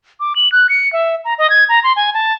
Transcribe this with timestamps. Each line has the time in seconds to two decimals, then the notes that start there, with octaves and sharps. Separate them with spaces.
0.20 D6
0.36 F#7
0.52 F#6
0.69 C#7
0.93 E5
1.25 A#5
1.38 D#5
1.50 G#6
1.69 A#5
1.84 C6
1.96 G#5
2.14 A5